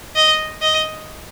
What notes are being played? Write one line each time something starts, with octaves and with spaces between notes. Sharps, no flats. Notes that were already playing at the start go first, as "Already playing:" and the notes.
D#5
D#5